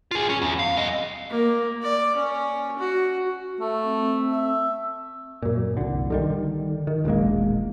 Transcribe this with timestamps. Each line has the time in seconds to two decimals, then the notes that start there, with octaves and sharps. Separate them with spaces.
0.11 F4 G#4
0.30 C#4
0.42 E2
0.59 F5
0.77 C4 D#5
1.30 A#3
1.82 D5
2.16 C#4
2.78 F#4
3.61 A3
3.84 C4
4.32 E5
5.42 F#2 A#2
5.77 C2 D3
6.10 D3 D#3 G3
6.87 D#3
7.05 E1 A#1 G#3 A#3